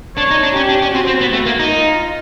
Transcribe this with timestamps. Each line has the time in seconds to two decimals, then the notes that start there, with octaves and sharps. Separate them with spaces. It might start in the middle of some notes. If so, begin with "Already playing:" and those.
0.17 D4 C#5
0.31 D#4
0.43 D4
0.56 C#4 G4
0.69 D4
0.82 C#4
0.95 C4 F#4
1.07 C4
1.21 B3
1.33 A3
1.46 A#3
1.59 D#4
1.73 F4